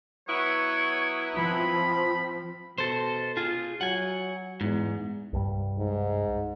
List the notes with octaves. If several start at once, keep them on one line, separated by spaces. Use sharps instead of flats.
F#3 B3 E4 C#5
F3 C4 B5
B2 A4 C5
F4 G#4
F#3 F#5 G#5
E2 G#2
C2 G2 G3
G#2